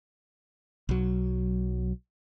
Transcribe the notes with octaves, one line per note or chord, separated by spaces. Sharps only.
B1 F#3